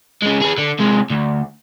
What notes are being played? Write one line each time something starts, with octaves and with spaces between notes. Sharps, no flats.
C#3 G#3
G#4 B4
D3
C3 G#3
D2